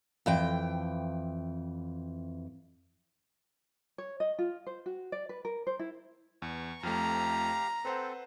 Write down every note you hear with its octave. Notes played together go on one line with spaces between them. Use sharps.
F2 E3 G5
C#5
D#5
F4
C5
F#4
D5
B4
A#4
C5
E4
E2 C#6
F2 F3 A3 G4 F5 A#5
C4 A4 B4 C5 F#5